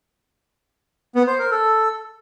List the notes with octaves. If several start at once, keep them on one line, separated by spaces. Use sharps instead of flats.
B3
C5
A#4
A4